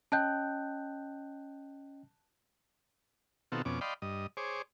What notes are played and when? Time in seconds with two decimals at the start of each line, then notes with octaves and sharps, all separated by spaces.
0.12 C#4 D#5 G5 A5 F#6 G6
3.52 B2 D#3 C4 F4 F#4 A4
3.65 F2 B2 C#4 D6
3.81 D5 D#5 F5 G5 B5 C6
4.02 G2 D#5
4.37 G#4 C5 C#5 D6